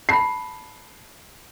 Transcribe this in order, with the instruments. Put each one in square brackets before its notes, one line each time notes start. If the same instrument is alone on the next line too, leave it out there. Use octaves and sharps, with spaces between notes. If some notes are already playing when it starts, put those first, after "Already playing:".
[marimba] A5 B5 [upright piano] C7